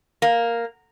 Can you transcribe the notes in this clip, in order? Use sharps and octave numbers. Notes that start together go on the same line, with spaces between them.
A#3